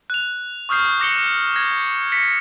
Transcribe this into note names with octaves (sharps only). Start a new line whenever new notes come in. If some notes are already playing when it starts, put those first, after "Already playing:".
F#6 F7
C#6 D#6 F6 G6 C7
D6 A#6 C#7 G7
G#6 A#6
A#6 B6 C#7